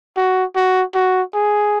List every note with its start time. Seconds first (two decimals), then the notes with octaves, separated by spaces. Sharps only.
0.17 F#4
0.56 F#4
0.95 F#4
1.34 G#4